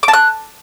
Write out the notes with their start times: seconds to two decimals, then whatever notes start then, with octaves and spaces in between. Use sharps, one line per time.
0.03 D6
0.08 A5
0.13 F#6